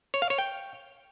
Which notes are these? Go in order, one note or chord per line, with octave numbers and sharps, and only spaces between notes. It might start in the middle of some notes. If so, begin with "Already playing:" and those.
C#5
F5
C#5
G5